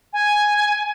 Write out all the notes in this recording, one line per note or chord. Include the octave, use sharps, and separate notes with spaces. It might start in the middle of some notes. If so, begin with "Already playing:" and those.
G#5